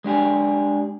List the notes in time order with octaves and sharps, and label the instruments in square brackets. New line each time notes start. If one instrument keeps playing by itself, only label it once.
[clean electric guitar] G#3 D4 G4 G#4